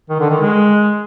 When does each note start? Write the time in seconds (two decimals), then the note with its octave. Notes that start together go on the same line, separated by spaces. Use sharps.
0.10 D#3
0.20 D3
0.30 D#3
0.40 G#3